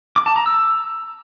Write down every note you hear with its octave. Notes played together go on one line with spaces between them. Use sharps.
D6
A5
A#5
E6